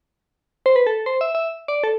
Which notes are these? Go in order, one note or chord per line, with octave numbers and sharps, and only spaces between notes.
C5
B4
A4
C5
E5
E5
D5
A4